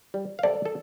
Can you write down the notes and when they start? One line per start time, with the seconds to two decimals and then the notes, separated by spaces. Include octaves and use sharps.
0.14 G3
0.39 F5
0.43 C3 A4 D5
0.65 A4